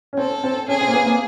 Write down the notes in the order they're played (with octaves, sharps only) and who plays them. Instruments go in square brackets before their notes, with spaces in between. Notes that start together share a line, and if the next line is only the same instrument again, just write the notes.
[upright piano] C#4
[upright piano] C4 [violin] A4
[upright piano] C4
[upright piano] C#4 [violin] G#4
[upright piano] C4
A#3
B3
A#3